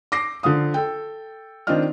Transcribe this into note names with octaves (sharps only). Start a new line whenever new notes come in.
D6 A#6 C7
D3 F3 F5 D#6
A4 G5
D#3 C4 D4 F4 D#5 F6